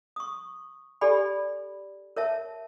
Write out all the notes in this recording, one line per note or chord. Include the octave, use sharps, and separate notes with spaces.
C#6 D#6
G4 A4 D5 G#5 B5
A#4 C#5 E5 A5